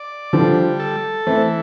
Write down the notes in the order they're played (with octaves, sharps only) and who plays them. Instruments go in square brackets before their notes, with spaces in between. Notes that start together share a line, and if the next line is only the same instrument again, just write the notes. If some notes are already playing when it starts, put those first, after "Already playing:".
Already playing: [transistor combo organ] D5
[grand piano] D3 F3 [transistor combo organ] G3
[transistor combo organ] A4
[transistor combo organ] E3 [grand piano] A3 C4